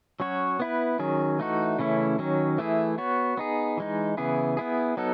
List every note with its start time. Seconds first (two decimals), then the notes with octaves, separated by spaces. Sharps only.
0.20 F#3 C#4 F#4 C#5
0.60 B3 E4 B4
0.99 D#3 F#3 C#4 G#4
1.39 E3 A3 D#4 F#4
1.79 C#3 E3 A3 C#4 E4
2.19 D#3 F#3 C#4
2.58 E3 A3 E4 G#4
2.98 B3 F#4 C#5
3.37 B3 D#4 G#4
3.77 E3 G#3 D#4
4.17 C#3 E3 B3 E4 G#4
4.57 B3 E4 G#4
4.97 F#3 B3 D#4 A4